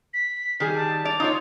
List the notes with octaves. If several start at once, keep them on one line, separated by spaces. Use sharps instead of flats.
B6
D#3 G3 G#4
A5
D5 F7
D#4 F4 C#5